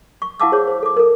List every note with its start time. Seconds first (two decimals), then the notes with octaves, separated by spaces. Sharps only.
0.22 C#6
0.40 E4 F5 F#5 A5 D6 E6
0.52 G#4 C5 C#5
0.67 C5
0.83 A4 D6
0.97 A4 A#4